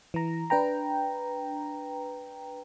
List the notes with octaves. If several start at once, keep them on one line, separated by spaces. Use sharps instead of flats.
E3 A#5
D4 B4 G5 A#5